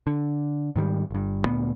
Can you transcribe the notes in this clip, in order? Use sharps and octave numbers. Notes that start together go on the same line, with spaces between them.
D3
G#2 D#3 F#3 G3
G1 G2
D2 A#2 B3